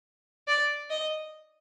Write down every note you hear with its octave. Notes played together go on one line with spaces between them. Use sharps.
D5
D#5